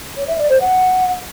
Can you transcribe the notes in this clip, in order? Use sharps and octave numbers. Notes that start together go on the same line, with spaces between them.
C#5
E5
D5
C5
F#5